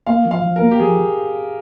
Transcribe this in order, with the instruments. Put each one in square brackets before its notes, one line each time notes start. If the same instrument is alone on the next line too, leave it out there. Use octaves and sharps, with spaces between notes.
[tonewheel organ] A#3 [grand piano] F5
[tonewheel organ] F3
[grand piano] F5
[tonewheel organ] F3
[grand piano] A#4
[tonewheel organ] A#3
[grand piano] G4
[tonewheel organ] F3 [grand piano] G#4